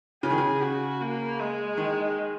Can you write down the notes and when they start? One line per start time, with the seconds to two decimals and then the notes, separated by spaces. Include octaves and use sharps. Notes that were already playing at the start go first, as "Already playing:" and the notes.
0.23 C#3 G#4
0.30 D#3
0.38 C#3
0.62 F#4
1.01 A#3
1.40 G#3
1.77 D#3